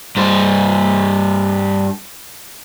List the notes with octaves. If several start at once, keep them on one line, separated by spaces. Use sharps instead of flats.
G2 C5